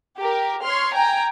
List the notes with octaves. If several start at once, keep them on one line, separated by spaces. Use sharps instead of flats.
G4 A#4
C#5 C6 F6
G5 G#5 A#5